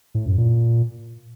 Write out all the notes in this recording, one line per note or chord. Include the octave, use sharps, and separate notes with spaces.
A2
F#2
A#2